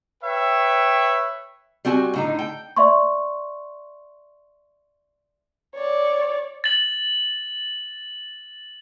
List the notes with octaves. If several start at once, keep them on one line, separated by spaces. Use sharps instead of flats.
B4 C#5 E5 G5
G3 C4 F#4 G#5
A2 D3 D#4
G5
D5 E5 C6 C#6
C#5 D5
A6 F#7